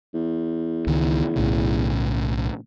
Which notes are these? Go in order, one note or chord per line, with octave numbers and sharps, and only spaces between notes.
E2
C#2 D#3
B1 A2 C#3